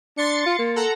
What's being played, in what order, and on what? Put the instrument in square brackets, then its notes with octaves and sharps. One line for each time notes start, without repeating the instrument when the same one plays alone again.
[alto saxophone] D4 [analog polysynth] C6 A6 C#7
[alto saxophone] F4
A#3
[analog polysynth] A4 F#5 A#5